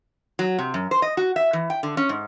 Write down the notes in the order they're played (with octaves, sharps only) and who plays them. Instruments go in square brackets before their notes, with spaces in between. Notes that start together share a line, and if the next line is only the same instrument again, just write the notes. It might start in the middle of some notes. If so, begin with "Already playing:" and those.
[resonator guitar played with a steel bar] F#3
C3
F#2
C5
D#5
F#4
E5
E3
G5
D3
C#4
G#2